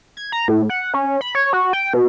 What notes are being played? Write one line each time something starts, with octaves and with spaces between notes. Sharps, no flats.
G#6
A#5
A2
F#5
C#4
B5
C#5
F#4
G5
B2